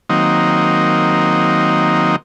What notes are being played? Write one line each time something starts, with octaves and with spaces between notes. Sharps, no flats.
D#3 F#3 A#3 C4 D#4